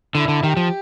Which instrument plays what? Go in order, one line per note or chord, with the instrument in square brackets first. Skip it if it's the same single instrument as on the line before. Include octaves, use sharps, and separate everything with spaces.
[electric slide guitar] D3 [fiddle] E4
[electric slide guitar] D3
[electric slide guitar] D#3 [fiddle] G4
[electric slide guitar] F3